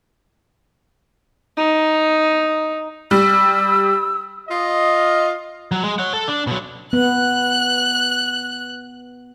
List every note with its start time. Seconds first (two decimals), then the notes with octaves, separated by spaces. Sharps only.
1.57 D#4
3.11 G3 E6
4.49 F4 D#5
5.71 F#3
5.84 G#3
5.99 C#5 F#5
6.13 A4
6.28 D4
6.47 B2 F#3
6.93 B3 F#6